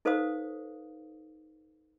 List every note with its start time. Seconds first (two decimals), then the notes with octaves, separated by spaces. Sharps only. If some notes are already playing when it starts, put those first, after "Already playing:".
0.05 D#4 A4 B4 C5 F5 D#6